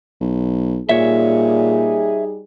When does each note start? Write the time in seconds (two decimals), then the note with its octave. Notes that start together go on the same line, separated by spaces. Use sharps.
0.21 B1
0.89 A#2 G3 D#4 G#4 C#5 E5